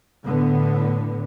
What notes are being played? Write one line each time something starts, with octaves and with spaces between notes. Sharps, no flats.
A2 D3 B3